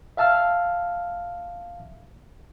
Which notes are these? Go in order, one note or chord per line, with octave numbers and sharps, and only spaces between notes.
E5 F5 A5 E6 F6